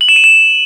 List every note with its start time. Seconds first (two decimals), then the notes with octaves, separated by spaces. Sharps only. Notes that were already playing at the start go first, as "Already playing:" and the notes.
0.01 F#7
0.09 E7
0.16 D#7
0.24 E7